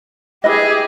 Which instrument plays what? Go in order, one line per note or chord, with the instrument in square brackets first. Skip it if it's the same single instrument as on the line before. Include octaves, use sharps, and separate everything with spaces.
[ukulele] E4 B4 D#5 [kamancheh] G4 G#4